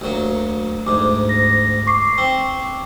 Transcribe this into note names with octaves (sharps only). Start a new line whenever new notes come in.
D2 F#3 A#3
D2 G#2 D6
A#6
C#6 D6 C7
C4